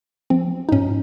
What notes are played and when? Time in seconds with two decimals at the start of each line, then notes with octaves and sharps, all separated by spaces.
0.30 F3 C4
0.69 D#4
0.72 G#2 C#4